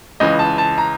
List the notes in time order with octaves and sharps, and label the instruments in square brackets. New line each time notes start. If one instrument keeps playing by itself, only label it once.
[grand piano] C#2 C#3 E3 D#5
A5
A5
A#5